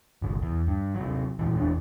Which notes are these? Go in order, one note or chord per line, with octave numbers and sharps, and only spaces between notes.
G1 C2
E2
G2
C3 F#3
E2 A#2 E3
E2 E3 C4 D4